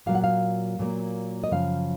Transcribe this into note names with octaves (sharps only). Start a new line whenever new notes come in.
A#2 F#3 A#3 F5
F#5
F5
A#2 F#3 A#3
D#5
F#2 C#3 F3 F5